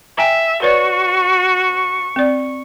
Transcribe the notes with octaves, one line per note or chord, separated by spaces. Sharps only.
E5 G5 G#5 A#5
F#4 B4 C#5 D5 C#6
C4 D5